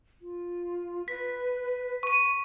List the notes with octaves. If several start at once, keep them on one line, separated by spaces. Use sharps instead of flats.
F4
B4 B6
C#6 D#7